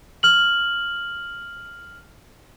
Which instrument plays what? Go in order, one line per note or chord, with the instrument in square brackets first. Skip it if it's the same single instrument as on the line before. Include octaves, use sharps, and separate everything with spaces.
[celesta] F6 F#7